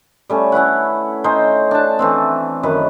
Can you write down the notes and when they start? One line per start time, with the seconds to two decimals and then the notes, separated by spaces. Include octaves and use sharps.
0.30 G3 A3 C#4
0.52 C#4 E4 B4 F#5
1.24 C#4 D#4 C5
1.71 D4 A5
1.99 E3 A3 C4
2.63 F#2 D#3 B4